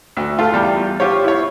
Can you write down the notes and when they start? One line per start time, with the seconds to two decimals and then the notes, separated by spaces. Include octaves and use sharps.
0.17 D2
0.38 A3 F4
0.53 E2 G3
1.00 F4 G4 C5 C#5
1.24 E4 C#5